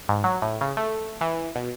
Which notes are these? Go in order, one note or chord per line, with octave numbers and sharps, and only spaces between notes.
G#2
F#3
A2
C#3
A3
E3
B2